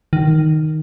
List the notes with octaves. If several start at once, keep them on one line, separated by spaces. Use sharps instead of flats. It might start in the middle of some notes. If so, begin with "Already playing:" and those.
D#3